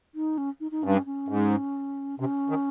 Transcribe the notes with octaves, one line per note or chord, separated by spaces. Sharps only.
D#4
C#4
D#4
D#4
G2 C#4
C#4
G#2
C3 C#4
D#3